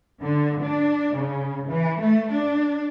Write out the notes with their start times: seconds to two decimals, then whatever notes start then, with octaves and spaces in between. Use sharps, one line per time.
0.22 D3
0.64 D4
1.17 C#3
1.68 E3
2.02 A3
2.33 D4